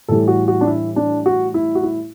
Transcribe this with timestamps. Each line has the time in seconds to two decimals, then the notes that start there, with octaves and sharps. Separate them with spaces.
0.08 A2 E3 G3 A4
0.28 F#4
0.48 F#4
0.61 D4
0.67 E4
0.96 D4
1.26 F#4
1.54 E4
1.75 F#4
1.83 E4